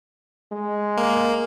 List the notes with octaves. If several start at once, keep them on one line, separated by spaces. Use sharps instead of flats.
G#3
A#3